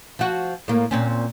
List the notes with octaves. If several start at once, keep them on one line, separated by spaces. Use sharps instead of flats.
F3 F#4
A2 A#3
A#2 C4 C#4